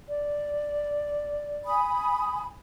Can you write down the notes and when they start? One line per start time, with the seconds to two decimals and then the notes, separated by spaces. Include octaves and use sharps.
0.09 D5
1.66 G#5 B5 D#6